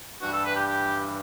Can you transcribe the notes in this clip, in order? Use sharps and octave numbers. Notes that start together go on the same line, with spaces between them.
G2 E3 G3 D4 F#4
A4
B4
G4
G4